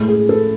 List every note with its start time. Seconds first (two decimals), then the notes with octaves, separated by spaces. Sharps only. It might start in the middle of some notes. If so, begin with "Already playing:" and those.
Already playing: A2 G#3 A4
0.08 G#4
0.29 A4